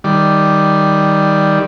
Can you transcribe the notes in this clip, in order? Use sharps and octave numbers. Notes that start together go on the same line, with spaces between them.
D#3 G3 D5